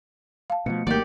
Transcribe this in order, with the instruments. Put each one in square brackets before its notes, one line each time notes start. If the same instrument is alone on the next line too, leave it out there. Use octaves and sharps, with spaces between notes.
[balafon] F5 A5
[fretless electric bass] B2 D3 F3 [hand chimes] A3 C#7
[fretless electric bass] G#1 D#3 F#3 [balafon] A#3 A#4 [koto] G4 D5